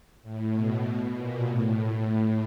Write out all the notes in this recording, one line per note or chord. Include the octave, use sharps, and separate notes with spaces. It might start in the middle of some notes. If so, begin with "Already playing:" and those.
A2
B2
B2
A#2
A2